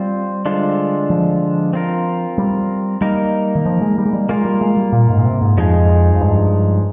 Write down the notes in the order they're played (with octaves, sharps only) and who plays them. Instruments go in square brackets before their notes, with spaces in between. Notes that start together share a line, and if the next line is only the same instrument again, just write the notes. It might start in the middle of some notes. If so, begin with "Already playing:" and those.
Already playing: [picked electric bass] G3 [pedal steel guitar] C4 F4 C5
[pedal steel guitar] D3 G#3 D4 F4 C5
[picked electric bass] F3
[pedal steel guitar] C4 F4 A#4
[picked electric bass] G3
[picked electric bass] G3 [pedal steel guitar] A#3 D#4 A#4
[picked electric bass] D#3
F3
G#3
G3
G#3
G3
[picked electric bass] G#3 [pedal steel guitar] A#3 F4 A#4
[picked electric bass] G3
G#3
G3
A#2
G#2
A#2
C3
G#2
[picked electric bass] F2 [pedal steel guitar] F3 G#3 D#4 G#4
[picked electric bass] F2
G2